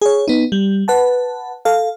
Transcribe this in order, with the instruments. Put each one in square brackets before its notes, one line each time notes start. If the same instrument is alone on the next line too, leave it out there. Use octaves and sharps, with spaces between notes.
[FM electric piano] G#4 C#5
B3 D#4
G3
B4 F#5 A5
A4 F5